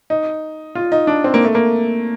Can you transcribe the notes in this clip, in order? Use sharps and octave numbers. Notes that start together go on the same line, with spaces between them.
D#4
F4
D#4
D4
C4
A#3
A3
A#3